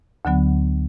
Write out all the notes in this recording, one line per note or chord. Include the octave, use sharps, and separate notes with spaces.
D2 D3 F#3 B3